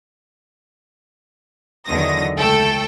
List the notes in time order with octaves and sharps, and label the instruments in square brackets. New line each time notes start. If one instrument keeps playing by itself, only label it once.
[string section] E2 D3 D#3 F#3 D#6 A#6
C#2 A3 A4 G5